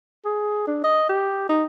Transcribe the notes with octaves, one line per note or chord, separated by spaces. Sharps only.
G#4
D4
D#5
G4
D#4